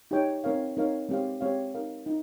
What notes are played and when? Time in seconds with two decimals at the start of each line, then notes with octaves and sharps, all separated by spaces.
0.11 D#4 G4 C#5 G5
0.44 C4 D#4 A#4 C#5 F5
0.77 C4 D#4 A#4 C#5 F5
1.09 G#3 C4 G4 C#5 F5
1.41 G#3 C4 G4 C#5 F5
1.74 D#4 A#4 F5
2.06 D#4